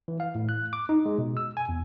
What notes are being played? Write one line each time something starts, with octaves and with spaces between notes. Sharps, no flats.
E3
F5
A2
F#6
D6
D#4
G#3
B2
E6
G#5
E2